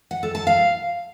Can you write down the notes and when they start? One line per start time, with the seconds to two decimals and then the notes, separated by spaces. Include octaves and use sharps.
0.11 F#5
0.23 A4
0.35 A5
0.47 F5